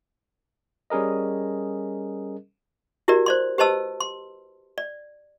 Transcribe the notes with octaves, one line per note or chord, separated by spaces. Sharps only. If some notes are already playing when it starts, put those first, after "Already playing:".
G3 C#4 G#4 A#4 D#5
E4 F#4 G4 A#4 D5
C5 D5 C6
G4 B4 C5 D#5 A5 E6
C6
D5